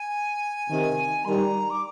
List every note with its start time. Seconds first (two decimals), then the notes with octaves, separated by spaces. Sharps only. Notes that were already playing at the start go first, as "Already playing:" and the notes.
Already playing: G#5
0.69 C3 D#3
1.25 D#3 G3 A#5 C6
1.70 D6